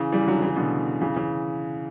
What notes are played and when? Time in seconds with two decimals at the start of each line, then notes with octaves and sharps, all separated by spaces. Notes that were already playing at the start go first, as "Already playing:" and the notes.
Already playing: C#3 E3
0.12 E3 G3
0.27 D3 F#3
0.42 C#3 E3
0.56 B2 D3
1.02 C#3 E3
1.16 C#3 E3